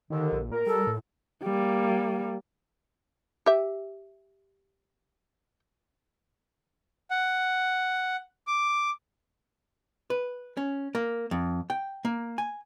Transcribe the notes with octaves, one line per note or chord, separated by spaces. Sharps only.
D#2 D3 D#3
A#1
A#2 A#4
G3 A4
A2
G3 A#3
G4 E5
F#5
D6
B4
C#4
A#3
F2
G5
A#3
G#5